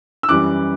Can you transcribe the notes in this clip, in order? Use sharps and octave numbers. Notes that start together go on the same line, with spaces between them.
E6
F#2 E3 G3 D6 F#6